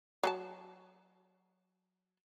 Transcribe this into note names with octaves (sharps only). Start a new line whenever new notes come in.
F#3 A4 A5